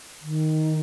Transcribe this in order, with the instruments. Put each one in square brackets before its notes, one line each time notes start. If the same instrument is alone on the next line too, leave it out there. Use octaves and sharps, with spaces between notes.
[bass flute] D#3